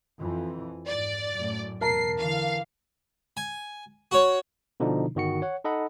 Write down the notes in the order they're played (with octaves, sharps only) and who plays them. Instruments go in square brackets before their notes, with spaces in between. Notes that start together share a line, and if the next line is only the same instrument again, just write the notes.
[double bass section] F2 E3
[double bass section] G#2 [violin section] D5
[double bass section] F#2 A2
[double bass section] E2 B2 [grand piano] A#4 A5 A#5 [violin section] C7
[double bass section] D3 E3 [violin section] F5
[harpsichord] G#5
F#4 C#5
[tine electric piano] B2 D3 F3 D4 D#4
G1 D#3 F#4 C#7
C#5 F#5
D#4 A4 D#5 F#5 B5